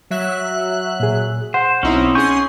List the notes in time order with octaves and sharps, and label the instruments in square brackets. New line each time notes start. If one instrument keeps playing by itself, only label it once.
[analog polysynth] F#3 E5 F#6
[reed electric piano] A#2 G#4
[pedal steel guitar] C5 [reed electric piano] F#5
[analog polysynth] B1 D#4 E4 [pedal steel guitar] C4 C#4
[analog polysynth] C#4 G#4 C6 [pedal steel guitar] G#5 C#6 G6